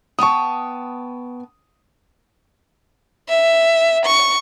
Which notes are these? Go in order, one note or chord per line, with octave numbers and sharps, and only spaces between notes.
B3 G5 A5 C#6 D#6
E5
C#6